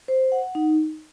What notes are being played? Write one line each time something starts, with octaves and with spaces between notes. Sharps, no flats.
C5
F#5
D#4